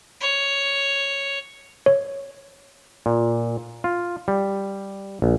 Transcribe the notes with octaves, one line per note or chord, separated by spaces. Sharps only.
C#5
C#5
A#2
F4
G3
A#1